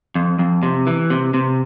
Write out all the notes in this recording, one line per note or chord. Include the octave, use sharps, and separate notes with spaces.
F2
F2
C3
E3
C3
C3